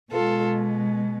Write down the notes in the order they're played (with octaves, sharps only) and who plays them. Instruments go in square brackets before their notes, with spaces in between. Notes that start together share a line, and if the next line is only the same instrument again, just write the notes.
[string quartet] B2 G#3 F4 A4